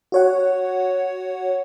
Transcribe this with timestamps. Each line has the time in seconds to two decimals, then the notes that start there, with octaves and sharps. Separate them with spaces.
0.12 F#4 C#5 F#5